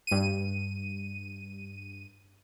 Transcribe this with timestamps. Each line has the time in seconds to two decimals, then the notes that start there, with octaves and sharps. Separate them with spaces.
0.07 G2 D#7